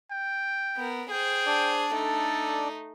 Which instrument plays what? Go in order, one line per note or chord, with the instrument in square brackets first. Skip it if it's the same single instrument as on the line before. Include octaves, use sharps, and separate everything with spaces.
[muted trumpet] G5
[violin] B3 A#4
[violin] G#4 C5 [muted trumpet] G5
[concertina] D4 D5
[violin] A3 D#4 [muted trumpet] A4